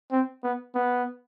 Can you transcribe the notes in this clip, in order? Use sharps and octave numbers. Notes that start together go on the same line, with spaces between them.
C4
B3
B3